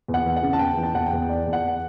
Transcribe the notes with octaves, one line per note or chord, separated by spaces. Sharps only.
E2
F#5
E3
F#5
C#3
A5
E2 G5
E3
A5
E2 F#5
G5
E2
E3 D5
E2
F#5
E2